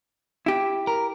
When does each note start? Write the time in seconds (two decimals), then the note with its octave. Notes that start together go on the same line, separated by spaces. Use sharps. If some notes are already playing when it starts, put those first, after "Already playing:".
0.46 E4 G4
0.87 A#4